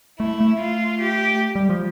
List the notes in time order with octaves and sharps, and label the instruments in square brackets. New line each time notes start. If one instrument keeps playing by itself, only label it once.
[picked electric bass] A3 [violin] E4
[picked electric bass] A3
[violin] F4
G4
[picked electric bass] G3
F3